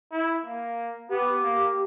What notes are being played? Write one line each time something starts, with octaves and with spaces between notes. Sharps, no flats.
E4
A#3
B3 G4
A#3